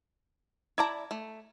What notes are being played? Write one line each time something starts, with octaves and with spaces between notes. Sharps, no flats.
E4 D5 A5 A#5 D6 G#6
A3